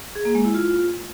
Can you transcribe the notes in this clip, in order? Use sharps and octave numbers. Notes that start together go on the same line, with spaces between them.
G#4
A#3
G#3
E4
F4